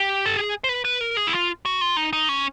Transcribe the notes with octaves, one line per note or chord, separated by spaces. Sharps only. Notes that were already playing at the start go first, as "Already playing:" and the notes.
Already playing: G4
A4
G#4
C5
B4
B4
A#4
G#4
E4
F4
F#4
F4
D#4
D#4
C#4